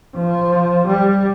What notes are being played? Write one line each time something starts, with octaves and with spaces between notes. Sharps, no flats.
F3
G3